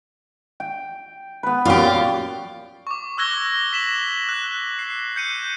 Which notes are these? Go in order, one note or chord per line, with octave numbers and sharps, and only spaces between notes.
G5
B3 B4
F#2 A#2 F4 G4
C#6 D6
C#6 E6 F#6 G#6 A#6 G7
B6 E7 F#7
F#6
C7
G6 C#7 D#7